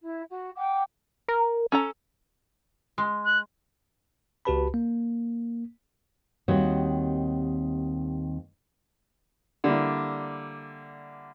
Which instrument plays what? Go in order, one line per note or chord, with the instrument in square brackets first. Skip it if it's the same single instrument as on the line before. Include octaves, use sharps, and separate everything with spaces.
[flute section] E4
F#4
F#5 G5 D6
[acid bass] A#4
[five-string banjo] C#4 A4 A#5
[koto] G#3
[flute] F#6
[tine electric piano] C#2 F#4 G4 B4 A5 B5
A#3
[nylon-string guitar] D#2 D#3 G3 C4 F#4 C#5
[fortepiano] D3 G3 A#3 E4